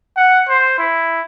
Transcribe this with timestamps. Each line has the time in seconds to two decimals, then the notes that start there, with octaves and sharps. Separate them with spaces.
0.17 F#5
0.49 C5
0.79 E4